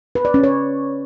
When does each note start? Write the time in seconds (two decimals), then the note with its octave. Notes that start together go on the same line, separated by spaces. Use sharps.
0.15 B4
0.25 D5
0.34 C#4
0.44 C#5